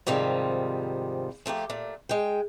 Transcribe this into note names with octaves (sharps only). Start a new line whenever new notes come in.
G#2 C3 D#3 F3 G3
F3 A3 A#3 G4
A#2 A3
G#3 G5